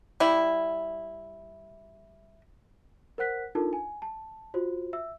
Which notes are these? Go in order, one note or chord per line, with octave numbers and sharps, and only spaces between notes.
G3 E4
A#4 C5 F#5 F#6 B6
D4 D#4 F4 A4 A#4 A5
G#5
A5
F4 F#4 C5
E5 E6